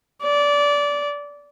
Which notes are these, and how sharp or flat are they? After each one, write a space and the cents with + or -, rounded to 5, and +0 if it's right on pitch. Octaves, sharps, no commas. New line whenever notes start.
D5 -20